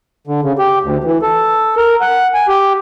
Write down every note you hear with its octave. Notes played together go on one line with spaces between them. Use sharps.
D3
C#3
G4
D2
E3
A4
A#4
F#5
G#5
G4